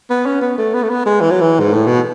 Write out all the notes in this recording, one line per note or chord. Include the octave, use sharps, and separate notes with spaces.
B3
C#4
B3
A3
B3
A3
B3
G#3
E3
F#3
E3
G#2
A2
B2